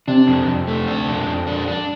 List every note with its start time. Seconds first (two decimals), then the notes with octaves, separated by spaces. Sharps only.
0.08 C3 D4
0.28 F2
0.47 F2
0.67 A3
0.88 D4
1.07 F2
1.27 F2
1.47 D4
1.68 D4